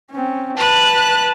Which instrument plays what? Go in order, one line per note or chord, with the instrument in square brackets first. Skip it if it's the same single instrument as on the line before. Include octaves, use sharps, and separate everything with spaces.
[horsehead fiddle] C4 C#4
[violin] B4 F#6 [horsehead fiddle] A5